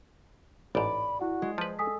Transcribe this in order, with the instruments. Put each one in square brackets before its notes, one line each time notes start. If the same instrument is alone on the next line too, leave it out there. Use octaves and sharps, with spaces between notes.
[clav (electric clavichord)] A1 G#2 [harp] D5 [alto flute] B5
[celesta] E4 F#5 [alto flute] F#4
[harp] G#3
[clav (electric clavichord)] F3 B4 [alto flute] C5 [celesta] A5
[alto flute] A4 [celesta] G#5 D#6 B6